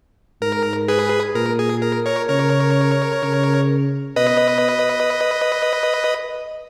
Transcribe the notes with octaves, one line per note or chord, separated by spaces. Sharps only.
G#2 A#4
G#4 B4
A#2 A#4
G#4
A#4
A#4 C#5
C#3 A#4 C#5
C#3
B2 B4 D#5